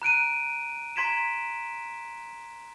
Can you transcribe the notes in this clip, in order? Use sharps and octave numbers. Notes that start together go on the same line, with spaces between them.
A#5 F#6 D7 D#7
A#5 C6 G#6 B6 D7 E7